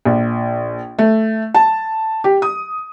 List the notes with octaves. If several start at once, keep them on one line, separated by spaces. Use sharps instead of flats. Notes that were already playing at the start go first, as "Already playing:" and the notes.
A#1
A3
A5
G4
D#6